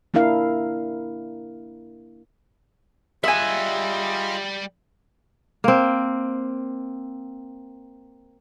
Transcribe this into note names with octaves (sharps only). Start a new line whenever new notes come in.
A#3 D4 E4 A#4 F5
G3 F4 G#4 D#5 E5 F#5 G#5
A#3 C4